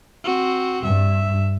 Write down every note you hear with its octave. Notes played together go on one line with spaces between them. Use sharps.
C4 F#4
G2 E5